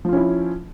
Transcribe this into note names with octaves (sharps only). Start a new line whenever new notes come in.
F3 C#4 E4 F4